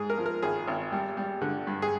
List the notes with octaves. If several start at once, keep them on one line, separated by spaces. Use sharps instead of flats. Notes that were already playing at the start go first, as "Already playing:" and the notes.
Already playing: G#2 G#4
A#4
F3
A#4
G#1 G#4
G#1
G3
G3
D3
G2
G#4